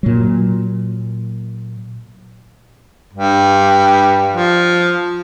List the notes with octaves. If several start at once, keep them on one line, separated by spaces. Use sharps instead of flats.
A#2 F#3
G2
F3